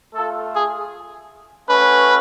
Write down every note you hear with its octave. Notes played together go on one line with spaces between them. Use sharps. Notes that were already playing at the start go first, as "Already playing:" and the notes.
A3 F4 A4
G#4
A3 C#4 F#4 B4